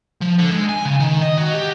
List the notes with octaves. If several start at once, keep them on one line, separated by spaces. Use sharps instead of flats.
F3
D3
G#3
G#5
C#3
D#3
D#5
F#3
G4